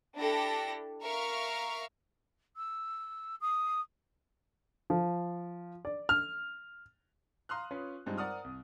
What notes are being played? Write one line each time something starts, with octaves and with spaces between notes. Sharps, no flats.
D4 E4 G4 A4 A#6
A#4 E5 F5 C#6 F6
E6
D#6
F3
D5
F6
F5 A#5 C6 D#6 F6 F#6
C#4 F4 B4 C#5 C6
G2 G3 G#3 C4 D#4 F4
A#4 C5 D5 F#5 D#6 F6
C2